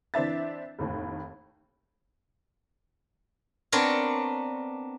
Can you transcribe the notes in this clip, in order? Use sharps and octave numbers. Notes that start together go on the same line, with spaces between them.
E3 C4 D4 E5 A6
F1 D#2 A2
B3 C4 D4 A#4 C#5